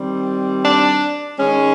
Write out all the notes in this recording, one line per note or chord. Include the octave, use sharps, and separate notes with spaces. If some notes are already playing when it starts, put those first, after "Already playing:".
Already playing: D#3 G3 C4
D4
D#3 G#3 C#4